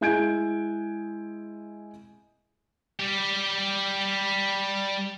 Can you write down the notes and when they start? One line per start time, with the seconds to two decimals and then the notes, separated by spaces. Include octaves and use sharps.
0.01 G#3 E4 G#5 G6 G#6 D7
2.99 G3 G4